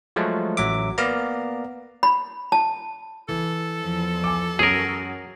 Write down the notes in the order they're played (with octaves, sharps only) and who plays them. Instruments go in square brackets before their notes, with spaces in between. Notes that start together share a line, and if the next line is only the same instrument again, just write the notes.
[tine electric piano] F3 F#3 G#3 A3
A1 F#3 E5 D6
A#3 B3 A#4 D5 F5 A#5
[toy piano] B5
A5
[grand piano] E3 [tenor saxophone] A4
[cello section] E2 F3
[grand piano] G#5 D6
[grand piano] F#2 D#6 [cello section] F#4 [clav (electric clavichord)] G#4 A#4